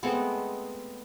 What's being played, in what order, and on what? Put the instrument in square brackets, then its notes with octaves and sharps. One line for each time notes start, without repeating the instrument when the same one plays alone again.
[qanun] G#3 A3 B3 C4